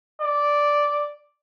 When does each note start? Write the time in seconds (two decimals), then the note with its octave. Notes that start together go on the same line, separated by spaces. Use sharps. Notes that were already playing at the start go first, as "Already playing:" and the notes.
0.22 D5